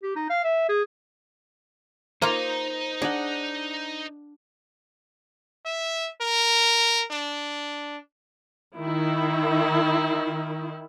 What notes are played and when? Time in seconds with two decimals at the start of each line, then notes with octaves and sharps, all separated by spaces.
0.03 G4
0.16 D#4
0.30 F5
0.44 E5
0.69 G#4
2.22 A#3 D#4 F4 C5 A#5
3.02 D4 G#4 D#5 F#5
5.65 E5
6.21 A#4
7.11 D4
8.78 D#3 E4